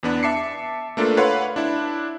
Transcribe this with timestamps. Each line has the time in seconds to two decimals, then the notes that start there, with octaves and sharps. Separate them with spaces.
0.03 E2 B3 D4
0.23 E5 A5 D6 C7 C#7
0.97 A3 A#3 D4 F4 A4 B4
1.17 B4 C#5 F5 F#5 B5 C6
1.56 D4 E4